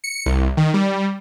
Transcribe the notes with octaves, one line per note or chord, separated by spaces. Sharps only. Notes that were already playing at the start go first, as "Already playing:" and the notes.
C#7
C2
D#3
G3